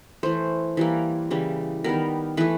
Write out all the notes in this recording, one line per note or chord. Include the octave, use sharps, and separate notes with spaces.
E3 A3 C5
E3 G3 A#3
C#3 E3 G3
D#3 G3 B3 A#4
E3 A3 B4